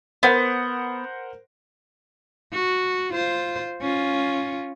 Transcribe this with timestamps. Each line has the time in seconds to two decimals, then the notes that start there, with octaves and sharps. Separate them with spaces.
0.23 B3 A#4 C5 F#5
2.52 F#4
3.13 F4 C5
3.81 C#4 F4